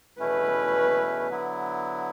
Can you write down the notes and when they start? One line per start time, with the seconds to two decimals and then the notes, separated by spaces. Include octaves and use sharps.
0.20 E2 B2 A3 C#4 E4 B4
1.29 D3 F#3 B3 E4